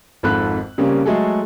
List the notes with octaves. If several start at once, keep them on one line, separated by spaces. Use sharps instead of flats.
G#1 F2 G#2 A4 B5 F#6
C#3 G3 A#3 C4 C#4
F#3 G#3 A3 G#4 A4